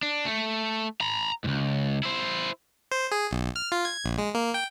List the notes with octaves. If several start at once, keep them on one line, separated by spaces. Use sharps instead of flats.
D4
A3
A#5 B5
C#2 G#2
E4 C5
C5
G#4
B1
F6
F4
G#6
A#1
G#3
A#3
G5